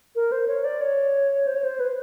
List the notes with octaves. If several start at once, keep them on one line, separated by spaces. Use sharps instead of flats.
A#4
C5
C#5
D5
C#5
C5
C#5
C5
B4